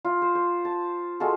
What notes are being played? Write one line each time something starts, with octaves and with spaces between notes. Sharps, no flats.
F4
C5
C5
A5
G#3 F4 F#4 A4